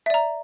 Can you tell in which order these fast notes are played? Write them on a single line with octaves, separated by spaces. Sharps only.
E5 D5 A#5